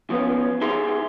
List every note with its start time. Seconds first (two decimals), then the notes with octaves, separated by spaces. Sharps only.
0.10 F3 B3 C#4 F4
0.61 D#4 G4 G#4 A#4 E5 C6